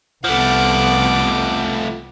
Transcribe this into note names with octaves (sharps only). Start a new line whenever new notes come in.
C2 F3 A3 B3 F#5 D6